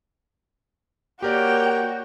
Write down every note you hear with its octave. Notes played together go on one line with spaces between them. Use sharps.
A#3 F#4 G4 A#4 C#5 D5 G5